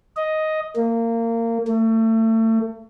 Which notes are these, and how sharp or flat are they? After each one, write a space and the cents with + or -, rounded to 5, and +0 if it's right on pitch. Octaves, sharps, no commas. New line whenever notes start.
D#5 +5
A#3 -25
A3 +30